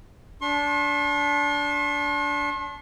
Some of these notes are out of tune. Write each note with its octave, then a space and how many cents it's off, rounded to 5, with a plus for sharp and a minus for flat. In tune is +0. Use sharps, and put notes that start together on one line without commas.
D4 -20 C6 +45